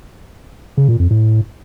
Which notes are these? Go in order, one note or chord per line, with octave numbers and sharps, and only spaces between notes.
C#3
A#2
F2
A2